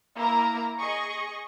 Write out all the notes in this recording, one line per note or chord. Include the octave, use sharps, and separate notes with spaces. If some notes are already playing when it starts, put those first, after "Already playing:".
A#3 E4 A#4 A#5
G#4 D#5 C#6